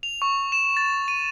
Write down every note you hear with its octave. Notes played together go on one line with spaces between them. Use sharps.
F7
C#6
E7
A6
D#7